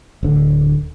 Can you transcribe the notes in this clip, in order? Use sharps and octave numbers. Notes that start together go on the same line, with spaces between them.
D1 D3